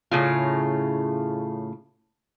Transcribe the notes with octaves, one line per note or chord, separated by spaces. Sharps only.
A2 C#3 F4